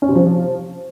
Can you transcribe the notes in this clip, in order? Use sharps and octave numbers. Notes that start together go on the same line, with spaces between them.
C#4
C3
F3